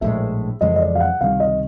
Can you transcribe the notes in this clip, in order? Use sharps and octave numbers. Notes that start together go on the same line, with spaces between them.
A#1 A2 E3 G#3 E5
F2 C#3 E3 G#3 D#5
D#5
D5
F5
F#5
C#2 C3 D#3 G3 F5
D#5